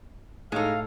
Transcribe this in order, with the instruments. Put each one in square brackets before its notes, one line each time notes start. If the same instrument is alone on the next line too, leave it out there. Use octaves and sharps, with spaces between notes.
[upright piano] A2 A4 [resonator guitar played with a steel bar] G#3 D#4 [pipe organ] F5